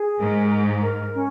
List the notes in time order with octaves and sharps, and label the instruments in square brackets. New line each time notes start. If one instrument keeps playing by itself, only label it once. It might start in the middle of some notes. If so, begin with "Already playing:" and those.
Already playing: [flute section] G#4
[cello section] G#2 [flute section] A#4
[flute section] A#5
A#4
C#4